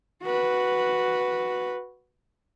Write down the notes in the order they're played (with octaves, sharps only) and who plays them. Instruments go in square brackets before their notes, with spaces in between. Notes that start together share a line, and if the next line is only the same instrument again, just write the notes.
[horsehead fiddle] F#4 B4